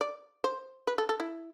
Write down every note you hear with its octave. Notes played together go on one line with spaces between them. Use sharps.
D5
C5
B4
A4
A4
E4